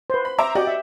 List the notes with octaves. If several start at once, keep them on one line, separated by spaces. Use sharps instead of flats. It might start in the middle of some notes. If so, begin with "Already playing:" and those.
B4 C5
B5
C5 E5 A#5 D6
F#4 G4 D5 D#5
E5